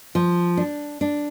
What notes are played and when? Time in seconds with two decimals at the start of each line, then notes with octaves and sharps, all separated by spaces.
0.15 F3
0.57 D4
1.01 D4